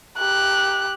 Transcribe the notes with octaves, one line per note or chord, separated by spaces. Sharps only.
G4 F#6